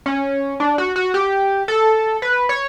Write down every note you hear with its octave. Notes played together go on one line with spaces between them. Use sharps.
C#4
D4
F#4
F#4
G4
A4
B4
C#5